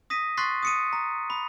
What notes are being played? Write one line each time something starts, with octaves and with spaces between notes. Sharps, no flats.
D#6 A#6 B6 D#7
C6 C#6 F#6 A6 B6 C7
D#6 C#7 D#7
A#5
B5